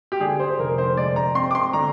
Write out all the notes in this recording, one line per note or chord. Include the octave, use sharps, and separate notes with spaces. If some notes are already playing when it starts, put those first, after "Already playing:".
G4
D3 G#4
C5
F1 A#4
C5
G#3 D5
A#5
C4 C6
D6
C6
D3 A#5